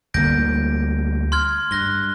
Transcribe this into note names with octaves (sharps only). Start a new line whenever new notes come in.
D2 G3 A#3 G6 A#6 D7
C6 F6 G#6
G2 F#6 A#6 G7